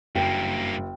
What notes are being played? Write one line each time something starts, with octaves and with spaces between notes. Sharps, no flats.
F#1 G2 A#3 G5